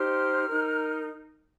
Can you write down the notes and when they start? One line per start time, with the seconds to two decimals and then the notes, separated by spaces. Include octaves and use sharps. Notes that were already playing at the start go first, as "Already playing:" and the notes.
Already playing: D#4 G4 C5 F6
0.47 D#4 A#4